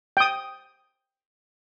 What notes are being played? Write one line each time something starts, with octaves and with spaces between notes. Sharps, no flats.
G5 D#6